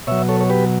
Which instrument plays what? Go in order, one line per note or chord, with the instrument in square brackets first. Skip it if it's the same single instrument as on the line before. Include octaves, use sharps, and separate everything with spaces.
[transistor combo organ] B2 F#3 C#5 E5
A4 C#5
C#5
G4 B4